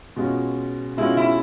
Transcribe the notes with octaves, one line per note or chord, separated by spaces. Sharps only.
B2 G#3 C#4 F4
B2 G#3 C#4 E4 F4
E4